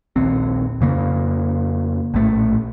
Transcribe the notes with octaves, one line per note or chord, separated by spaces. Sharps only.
A#1 D#2 C4
F2 C#3 A#3
A#1 A2 A3